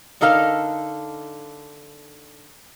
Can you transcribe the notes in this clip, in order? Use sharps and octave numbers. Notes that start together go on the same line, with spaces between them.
D3 D#4 A4 A#4 F5